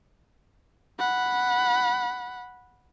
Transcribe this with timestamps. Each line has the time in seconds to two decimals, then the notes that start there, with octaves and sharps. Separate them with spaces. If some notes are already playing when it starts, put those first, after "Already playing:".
0.99 F#5 B5